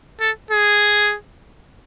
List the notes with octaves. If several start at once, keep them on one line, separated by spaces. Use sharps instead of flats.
A4
G#4